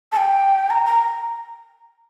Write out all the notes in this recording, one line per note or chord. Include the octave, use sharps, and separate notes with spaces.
A5
G5
A#5
A#5